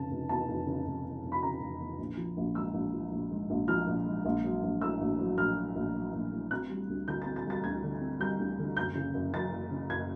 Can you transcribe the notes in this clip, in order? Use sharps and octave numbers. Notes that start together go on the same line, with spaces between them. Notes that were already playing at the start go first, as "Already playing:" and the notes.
Already playing: F1 C#3 A5
F1
E2 A5
F1
C#3
F1
E2
F1
B5
C#3 A#5
F1
E2
A#1
F3
A#1
G#2 E6
A#1
F3
A#1
G#2
A#1
F3 F6
A#1
G#2
A#1
F#3
A#1
A2 E6
A#1
F#3
A#1 F6
A2
A#1
F#3
A#1
A2
C4 F#6
G3
D2
D3 G6
C4 A6
A6
G3
A6
D2 G#6
D3
C4
G3 G6
D2
D3
F#1 G6
C#3
F#1
F#2 A6
F#1
C#3
F#1 G#6